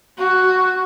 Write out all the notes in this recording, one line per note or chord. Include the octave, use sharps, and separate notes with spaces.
F#4